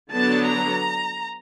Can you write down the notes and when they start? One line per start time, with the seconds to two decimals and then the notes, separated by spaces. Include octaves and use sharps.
0.12 D3 F#3 B3 D4 A5
0.48 A#5